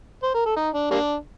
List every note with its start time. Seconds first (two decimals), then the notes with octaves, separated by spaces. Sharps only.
0.23 C5
0.34 A#4
0.45 A4
0.56 D#4
0.74 D4
0.91 G3 A#3 D4